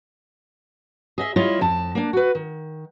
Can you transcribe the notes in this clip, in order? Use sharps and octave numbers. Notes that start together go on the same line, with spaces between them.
G#4 D#5 E5
G3 E4 F4 C#5 D#5
F2 A5
A#3 D4
F#4 B4
D#3